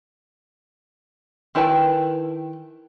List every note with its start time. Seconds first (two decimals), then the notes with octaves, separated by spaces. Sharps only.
1.55 D#3 E4 B4 G5 A5